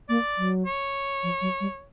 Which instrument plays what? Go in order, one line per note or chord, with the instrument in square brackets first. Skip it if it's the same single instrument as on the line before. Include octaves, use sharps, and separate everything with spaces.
[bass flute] A#3 [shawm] D5
[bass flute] F#3
[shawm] C#5
[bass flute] F3
F#3
G3